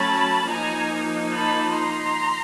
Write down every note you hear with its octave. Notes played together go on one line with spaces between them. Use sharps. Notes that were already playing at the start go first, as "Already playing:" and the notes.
Already playing: F#3 A3 C#4 A5 B5
F3 A#3 D#4 G#5 A#5
A5 B5
A#5 C6